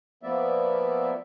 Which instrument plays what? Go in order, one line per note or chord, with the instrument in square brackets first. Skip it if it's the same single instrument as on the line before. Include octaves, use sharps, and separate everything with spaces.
[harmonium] F3 A#3 B3 D5 E5